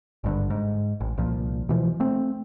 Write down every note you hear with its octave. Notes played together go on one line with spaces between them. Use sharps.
G#1 G2 D3
G#2
A1
C2 A#2 F3
B2 E3 F3
A3 C4